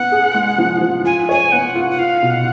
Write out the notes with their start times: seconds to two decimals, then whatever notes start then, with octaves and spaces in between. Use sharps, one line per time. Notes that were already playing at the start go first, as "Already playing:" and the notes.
Already playing: B3 F#5
0.12 G#4
0.34 G#3
0.58 F3
0.81 F3
1.05 F4 G#5
1.29 C#5 G#5
1.52 B3 F#5
1.76 F4
1.91 F#5
1.98 F4 F5
2.23 B2
2.30 F#5